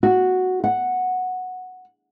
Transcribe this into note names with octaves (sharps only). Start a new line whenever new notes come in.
F#4
F#5